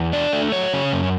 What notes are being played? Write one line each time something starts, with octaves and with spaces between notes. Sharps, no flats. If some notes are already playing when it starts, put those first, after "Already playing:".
Already playing: E2
D4 D5
A3
F#3 C#5
C#3
F#2